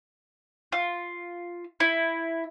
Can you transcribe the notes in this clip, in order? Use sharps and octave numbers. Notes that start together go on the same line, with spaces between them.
F4
E4